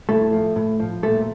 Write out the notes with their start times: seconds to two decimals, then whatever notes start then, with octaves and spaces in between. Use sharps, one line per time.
0.09 A2 A3 A4
0.32 F3
0.56 A2
0.80 F3
1.03 A#2 A3 A4